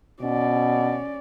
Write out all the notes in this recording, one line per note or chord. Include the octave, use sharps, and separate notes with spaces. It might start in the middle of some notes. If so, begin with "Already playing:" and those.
B2 C#4 D5